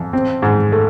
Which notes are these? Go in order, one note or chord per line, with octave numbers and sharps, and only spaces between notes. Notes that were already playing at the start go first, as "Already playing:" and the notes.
Already playing: F2
C4
G#2
A3